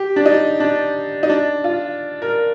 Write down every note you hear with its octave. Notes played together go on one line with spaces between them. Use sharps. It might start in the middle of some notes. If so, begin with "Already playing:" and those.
Already playing: G4
D4
D#4
D4
D#4
D4
F4
A#4